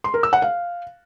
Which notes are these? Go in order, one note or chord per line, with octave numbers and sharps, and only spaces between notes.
C6
A#4
E6
F#5
F5